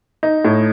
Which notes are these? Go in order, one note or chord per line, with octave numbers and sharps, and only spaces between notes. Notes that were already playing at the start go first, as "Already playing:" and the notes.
D#4
A2